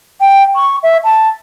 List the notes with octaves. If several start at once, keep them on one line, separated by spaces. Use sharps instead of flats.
G5
C#6
E5
A5